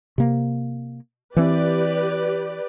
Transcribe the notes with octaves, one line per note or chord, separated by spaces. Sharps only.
C3 A#3
E3 C4 G4 B4 D5